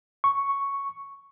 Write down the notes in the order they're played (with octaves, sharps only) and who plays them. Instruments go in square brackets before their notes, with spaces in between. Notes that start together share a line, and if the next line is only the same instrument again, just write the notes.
[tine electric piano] C#6